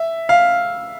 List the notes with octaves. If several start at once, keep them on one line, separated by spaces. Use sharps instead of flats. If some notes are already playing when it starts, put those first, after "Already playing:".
Already playing: E5
F5